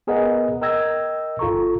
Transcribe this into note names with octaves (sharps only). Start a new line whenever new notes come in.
B3 G#4 A#4 B4 D#5 F#5
A#4 D#5 G5 E6 G#6 A#6
G1 F4 A4 A#5 C#6